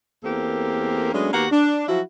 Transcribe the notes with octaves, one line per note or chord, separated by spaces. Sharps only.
E2 A#3 C4 G4 A4 A#4
F#3 G#3 A3 B3 C#4 D4
D#2 A#3 B3 F#4 G4 F#5
D4
F3 F#3 E4 F#4